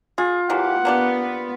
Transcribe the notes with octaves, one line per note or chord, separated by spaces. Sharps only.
F4 G#4
E3 F#3 A#3 G4 F#5
A#3 B3 D4 G4